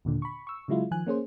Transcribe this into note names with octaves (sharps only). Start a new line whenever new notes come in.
D#2 A#2 D3
B5 C#6
C#6 E6
C#3 F#3 G#3 E4 F4
D#3 F3 G#5 F#6
A#3 C#4 G#4 C5